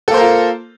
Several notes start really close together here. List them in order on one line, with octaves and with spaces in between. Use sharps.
A4 A#3 C5 A#4 F4